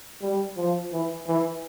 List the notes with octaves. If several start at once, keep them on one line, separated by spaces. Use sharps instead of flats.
G3
F3
E3
E3